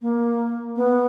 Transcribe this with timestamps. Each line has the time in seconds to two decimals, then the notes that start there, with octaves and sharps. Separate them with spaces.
0.02 A#3
0.76 B3